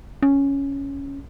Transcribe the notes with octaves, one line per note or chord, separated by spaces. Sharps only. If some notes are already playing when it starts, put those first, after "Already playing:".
C#4